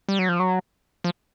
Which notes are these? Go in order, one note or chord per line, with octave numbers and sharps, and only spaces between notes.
G3
F#3
F3
F#3
F3